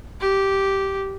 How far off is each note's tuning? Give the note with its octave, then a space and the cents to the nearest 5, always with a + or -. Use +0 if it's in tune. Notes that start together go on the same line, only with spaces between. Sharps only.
G4 -10